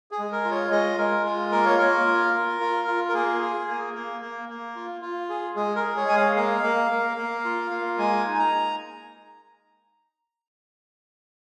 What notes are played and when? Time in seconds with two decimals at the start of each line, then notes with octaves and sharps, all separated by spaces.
0.11 G#4
0.19 G#3
0.32 A#4
0.45 F4
0.51 C#5
0.71 G#3 D#5
0.98 G#3 A#4
1.25 F4
1.52 A#3 A#4
1.66 C#5
1.78 A#3 A#4
2.06 F4
2.33 F4
2.60 F4
2.88 F4
3.09 A#4
3.14 A#3 G#4
3.41 G#4
3.68 A#3
3.94 A#3
4.21 A#3
4.49 A#3
4.76 F4
5.02 F4
5.29 G#4
5.55 G#3 G#4
5.76 A#4
5.82 G#4
5.97 C#5
6.09 G#3 G#5
6.17 F5
6.36 A#3 F5
6.63 A#3
6.91 A#3
7.17 A#3
7.45 F4
7.71 A#3
7.98 G#3 G#5
8.25 D#4
8.34 G#5
8.39 A#5